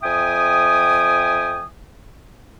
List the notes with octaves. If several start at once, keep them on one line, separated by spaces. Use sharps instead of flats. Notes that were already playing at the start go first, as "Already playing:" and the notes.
F2 E5 G5 G#5 D#6